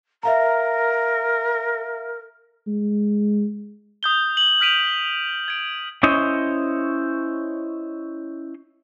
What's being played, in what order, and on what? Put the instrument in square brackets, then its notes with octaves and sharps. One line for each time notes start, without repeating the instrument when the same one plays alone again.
[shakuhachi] A#4 [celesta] E5 F5 A#5
[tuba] G#3
[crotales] D#6 G6 G7
F#7 G7
F6 G6 B6 D7 D#7 F7
G#6 D7
[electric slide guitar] C#4 E4 C5 C#5 D#5